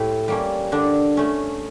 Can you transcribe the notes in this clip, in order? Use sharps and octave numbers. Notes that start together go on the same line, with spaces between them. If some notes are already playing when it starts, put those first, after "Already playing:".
Already playing: A2 E4 G4
G3 A#3 C#4
D3 D4
A3 C#4